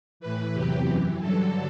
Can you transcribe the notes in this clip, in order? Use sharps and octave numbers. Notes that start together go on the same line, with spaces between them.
A2 E3 B4
E2 C3 F#3 G4
F#2 E3
G2 D3 F#3 A4